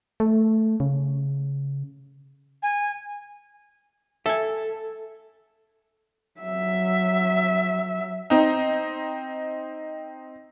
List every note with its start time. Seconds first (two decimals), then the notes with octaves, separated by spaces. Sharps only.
0.20 A3
0.80 C#3
2.63 G#5
4.26 A4 E5 G#5
6.40 F#3 E5
8.30 C4 D#4